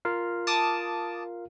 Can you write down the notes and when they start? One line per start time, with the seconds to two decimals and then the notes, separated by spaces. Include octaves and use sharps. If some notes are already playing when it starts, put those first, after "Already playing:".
0.05 F4 A#4 F5
0.47 A5 D6 D#6